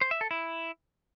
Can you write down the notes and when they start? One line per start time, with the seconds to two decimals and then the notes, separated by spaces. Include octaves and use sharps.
0.01 C5
0.11 E5
0.21 A4
0.31 E4